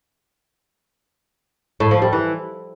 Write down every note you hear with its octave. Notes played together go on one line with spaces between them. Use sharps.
A2
F3
G3
E3